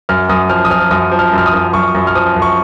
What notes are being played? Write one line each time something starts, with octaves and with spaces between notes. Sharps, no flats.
F#2 F6
F#2 D#6
F3 F6
D#6
F3 F6
F#2 D#6
F3
F6
F#2 F6
D#6
F#2
F#2 C#6
F#2
F6
F3 D#6
F#2
C#6